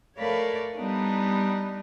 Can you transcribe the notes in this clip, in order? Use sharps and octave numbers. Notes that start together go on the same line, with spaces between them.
A3 A#4 B4 C#5 D5 F5
G3 B3 D4 D#4